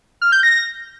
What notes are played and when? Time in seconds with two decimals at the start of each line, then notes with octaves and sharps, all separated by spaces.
0.22 F6
0.32 G6
0.43 A#6